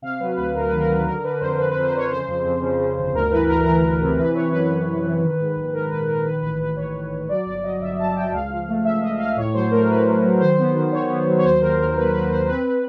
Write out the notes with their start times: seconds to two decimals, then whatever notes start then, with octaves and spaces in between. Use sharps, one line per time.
0.02 C3 F5
0.20 F#3 B4
0.37 D2 B4
0.55 D2 A#4
0.68 D#3 B4
0.80 A#4
0.89 F#3 B4
1.06 D3 A#4
1.24 D3 B4
1.40 F2 C5
1.58 F2 B4
1.71 F2 B4
1.84 C5
1.93 F2 C#5
2.10 C#3 C5
2.28 F2
2.45 F2
2.62 C#3
2.79 C#3
2.97 G1
3.14 D2 A#4
3.31 E3 B4
3.48 D2 A#4
3.66 E3 A#4
3.83 E3
4.01 C3
4.17 E3 B4
4.35 E3 C#5
4.52 F#2 B4
4.70 F#2
4.88 F#2
5.04 E3
5.22 D#3
5.39 G#2
5.56 A#1
5.73 G#2 A#4
5.91 A#1 B4
6.08 A#1 A#4
6.25 D#3 B4
6.42 A1 B4
6.60 A1 B4
6.77 A1 C#5
6.95 A1
7.12 A1
7.29 F#3 D5
7.46 G1 D5
7.64 F#3 D#5
7.81 G1 E5
7.99 F#3 A5
8.16 F#3 G5
8.32 C#2 F5
8.50 F3
8.68 A3
8.84 C#2 E5
9.02 C#2 D#5
9.19 A3 F5
9.36 A2 C#5
9.54 F#3 C5
9.71 A3 A#4
9.89 A2 B4
10.06 A3
10.24 F#3
10.40 D#3 C5
10.58 B3
10.75 D#3
10.92 D#3 C#5
11.10 B3
11.27 F#3
11.39 C#5
11.44 D#2 C5
11.61 D#2 A#4
11.79 D#2 A#4
11.96 A#3 B4
12.14 F#3 B4
12.31 D#2 C5
12.48 C4 B4